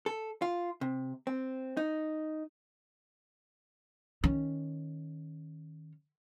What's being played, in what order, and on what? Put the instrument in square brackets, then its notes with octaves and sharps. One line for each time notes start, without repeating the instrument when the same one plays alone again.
[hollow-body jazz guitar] A4
F4
C3
C4
D#4
[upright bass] D#3 C#4